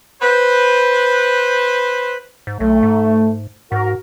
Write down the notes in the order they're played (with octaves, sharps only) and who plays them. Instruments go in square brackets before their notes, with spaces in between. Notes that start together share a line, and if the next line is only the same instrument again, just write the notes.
[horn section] B4 C5
[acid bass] G#2
[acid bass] B1 [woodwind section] A3
[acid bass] G#2
[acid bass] G#2 [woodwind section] F#4 A#4